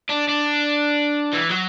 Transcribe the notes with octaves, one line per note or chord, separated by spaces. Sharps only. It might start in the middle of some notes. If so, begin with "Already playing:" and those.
D4
D4
E3
F#3